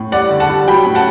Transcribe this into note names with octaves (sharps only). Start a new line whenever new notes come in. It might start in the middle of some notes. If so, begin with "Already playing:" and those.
Already playing: A2
G3 D5 F#5
D3
F#5 A5
G3
F#3 G5 B5
A2
F#5 A5